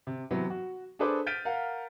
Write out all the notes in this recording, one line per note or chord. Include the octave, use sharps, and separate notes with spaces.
C3
C3 E3 F#3 B3
F#4
D4 G#4 A4 B4 C5 D6
F6 G6 A6 B6 D7 D#7
A#4 F5 F#5